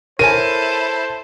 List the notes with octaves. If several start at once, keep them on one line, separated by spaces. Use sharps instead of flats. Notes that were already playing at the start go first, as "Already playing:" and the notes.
E4 A4 A#4 C5 C#5 G#5 D#7